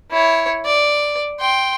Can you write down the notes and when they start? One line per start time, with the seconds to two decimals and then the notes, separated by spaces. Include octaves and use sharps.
0.11 E4 C#5
0.65 D5
1.40 G5 C6